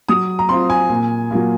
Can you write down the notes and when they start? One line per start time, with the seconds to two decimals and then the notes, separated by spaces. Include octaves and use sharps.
0.09 F#3 D#6
0.39 A#5
0.49 C4 F4 C6
0.70 G#5
0.89 A#2
1.31 F#3 A#3 F4